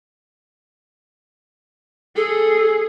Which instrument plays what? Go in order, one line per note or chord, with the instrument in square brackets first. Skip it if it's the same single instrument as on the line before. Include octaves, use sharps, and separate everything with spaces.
[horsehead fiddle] G#4 [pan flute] A4